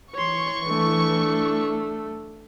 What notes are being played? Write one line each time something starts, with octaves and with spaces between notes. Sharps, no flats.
E3 C#5 C6 C#6
A3 D4